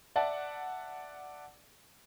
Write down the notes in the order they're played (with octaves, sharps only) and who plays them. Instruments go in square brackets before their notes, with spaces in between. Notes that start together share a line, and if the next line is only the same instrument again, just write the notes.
[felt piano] D5 E5 F#5 A5